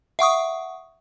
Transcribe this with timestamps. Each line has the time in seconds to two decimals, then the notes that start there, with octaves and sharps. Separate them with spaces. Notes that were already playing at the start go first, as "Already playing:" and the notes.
0.19 E5 F#5 C#6 D#6